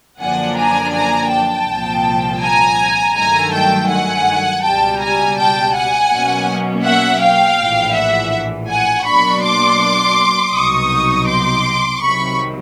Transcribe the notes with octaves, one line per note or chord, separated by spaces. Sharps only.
F#2 D3 F3 A#3 D4 F#5 G#5
G#5 A#5
G#5 A#5
G5 A5
C2 A#2 F3
G#5 A#5
G2 D#3 F#3 A3 G#5 A#5
G5 A5
F#5 G#5
C#2 B2 G3 G5 A5
G#5 A#5
G5 A5
F#5 G#5
B2 F#3 A#3 C#4
E5 F#5
F5 G5
A#1 A2 E3
E5 F#5
F#5 G#5
B2 F#3 A#3 D4 B5 C#6
C6 D6
C2 B2 F#3 B3 D#4 C#6 D#6
C6 D6
C2 C3 D#3 F#3 B5 C#6